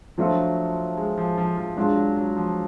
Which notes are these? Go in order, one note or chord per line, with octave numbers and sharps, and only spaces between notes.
F3 F#3 A3 D4 F4 A4
G#3
F3
F3
F3
F#3 G#3 D4 F4 G#4
F#3
F#3
F3